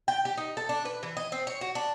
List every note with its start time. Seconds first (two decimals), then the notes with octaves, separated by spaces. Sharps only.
0.08 G5
0.25 G4
0.37 D#4
0.57 A4
0.69 D4
0.85 B4
1.03 E3
1.17 D#5
1.32 C4
1.47 C#5
1.61 F#4
1.75 D4